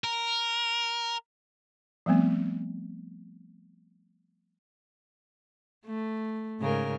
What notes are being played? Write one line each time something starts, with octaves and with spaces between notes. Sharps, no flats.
A#4
F3 G3 A3 B3 C4
A3
G#2 C#3 A#4